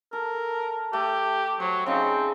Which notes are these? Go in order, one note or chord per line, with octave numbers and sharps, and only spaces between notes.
A4 A#4
A3 G4
F#3 C5
C#3 C4 D#4